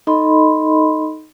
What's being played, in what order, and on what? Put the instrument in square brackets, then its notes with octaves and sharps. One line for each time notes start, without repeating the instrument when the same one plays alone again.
[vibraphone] D#4 A4 D#5 B5 C6